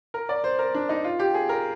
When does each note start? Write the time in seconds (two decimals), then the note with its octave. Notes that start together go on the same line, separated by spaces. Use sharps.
0.14 A#4
0.29 D5
0.44 C5
0.59 A#4
0.74 D4
0.89 D#4
1.04 F4
1.19 G4
1.34 G#4
1.49 A#4